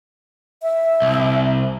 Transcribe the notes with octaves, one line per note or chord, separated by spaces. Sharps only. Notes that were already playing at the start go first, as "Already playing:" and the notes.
E5
C2